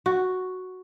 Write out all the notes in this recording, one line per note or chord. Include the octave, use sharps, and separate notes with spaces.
F#4